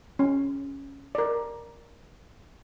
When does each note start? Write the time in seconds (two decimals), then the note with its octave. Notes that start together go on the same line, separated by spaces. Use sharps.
0.19 C#4
1.15 A#4 D5